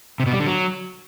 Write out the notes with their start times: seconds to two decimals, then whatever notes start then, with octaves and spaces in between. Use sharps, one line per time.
0.20 C3
0.26 B2
0.33 G3
0.40 D3
0.46 F#3